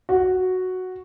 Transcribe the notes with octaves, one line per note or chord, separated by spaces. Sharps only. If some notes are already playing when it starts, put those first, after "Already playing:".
F#4